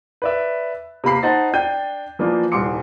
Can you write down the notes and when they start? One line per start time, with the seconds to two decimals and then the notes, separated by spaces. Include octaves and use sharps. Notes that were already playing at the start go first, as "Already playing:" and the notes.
0.22 B4 D5 E5
1.04 C3 A#3 B5 C7
1.23 D#4 C5 D#5 F#5 A5 A6
1.54 D4 G5 G6 D#7
2.19 E3 F3 A#3 D4 F4
2.52 D#1 C2 C6 D6 C#7